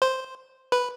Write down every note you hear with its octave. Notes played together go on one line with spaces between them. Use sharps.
C5
B4